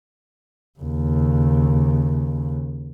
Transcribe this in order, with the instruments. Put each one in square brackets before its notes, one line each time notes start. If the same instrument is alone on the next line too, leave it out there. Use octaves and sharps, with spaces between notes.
[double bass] D#2 C#3